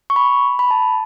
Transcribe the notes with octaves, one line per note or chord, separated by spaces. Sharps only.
C#6
B5
B5
A5